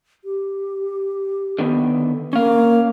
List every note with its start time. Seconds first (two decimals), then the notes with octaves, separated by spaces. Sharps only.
0.25 G4
1.59 D3 D#3 B3
2.33 A#3 C#4 F5